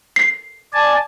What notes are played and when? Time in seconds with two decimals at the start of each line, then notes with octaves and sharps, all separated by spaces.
0.16 C7
0.74 D5 G#5 A5